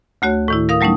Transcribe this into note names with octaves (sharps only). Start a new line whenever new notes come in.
D2 A3 F#4 C#5
A2 D#3 E4
A#4 F5 D#6
F#3 G3 A3 C#4 D#4